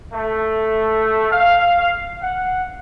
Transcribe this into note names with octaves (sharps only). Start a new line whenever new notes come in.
A3
F5
F#5